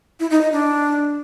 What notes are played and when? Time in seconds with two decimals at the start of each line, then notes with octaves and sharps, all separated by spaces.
0.20 E4
0.31 D#4
0.41 D#5
0.52 D4